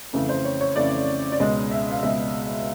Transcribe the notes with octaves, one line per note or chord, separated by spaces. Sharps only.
F2 C#3 E3 A3
C5
C#5
C#5
F2 C#3 E3 A3 D5
D5
C#2 B2 G#3 D#5
E5
F5
C#2 B2 G#3 E5